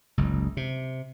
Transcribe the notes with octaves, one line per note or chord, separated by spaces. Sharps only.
F#1 C#2
C3